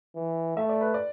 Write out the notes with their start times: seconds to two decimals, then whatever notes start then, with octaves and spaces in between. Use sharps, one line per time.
0.15 E3
0.56 A3 E5
0.69 D5
0.81 B4
0.94 D5